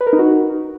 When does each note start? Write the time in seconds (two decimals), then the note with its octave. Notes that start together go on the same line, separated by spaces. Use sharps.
0.01 B4
0.07 A#4
0.13 D#4
0.19 F#4